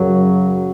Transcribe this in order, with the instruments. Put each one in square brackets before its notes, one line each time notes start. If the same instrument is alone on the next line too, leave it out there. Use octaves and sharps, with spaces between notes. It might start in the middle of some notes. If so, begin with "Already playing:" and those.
Already playing: [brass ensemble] F#2 C#3 F#3